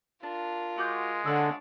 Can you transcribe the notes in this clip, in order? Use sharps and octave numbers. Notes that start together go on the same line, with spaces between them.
D4 F4 A#4
G#3 F#4 D6 G6
D3 D4 C#5 F5 F#5 E6